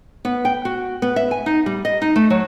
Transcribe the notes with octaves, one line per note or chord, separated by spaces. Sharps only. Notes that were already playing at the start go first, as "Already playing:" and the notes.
B3
G5
F#4
B3
E5
G#5
D#4
G3
D#5
D#4
A3
F#3